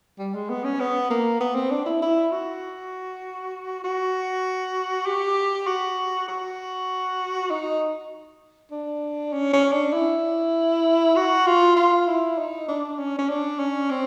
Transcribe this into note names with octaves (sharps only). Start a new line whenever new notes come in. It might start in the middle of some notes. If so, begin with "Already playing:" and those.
G3
G#3
B3
C#4
B3
A#3
B3
C4
D4
E4
E4
F#4
F#4
G4
F#4
F#4
D#4
D4
C#4
C#4
D4
E4
F#4
F4
F4
E4
D#4
D4
C#4
C#4
D4
C#4
C4